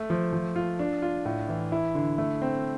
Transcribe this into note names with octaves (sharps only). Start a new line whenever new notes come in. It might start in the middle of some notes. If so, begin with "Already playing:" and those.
Already playing: A3
F3
F3
F4
D4
F4
A2
E3
E4
D3
A3
C4